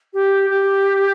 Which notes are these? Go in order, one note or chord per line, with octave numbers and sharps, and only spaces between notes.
G4
G4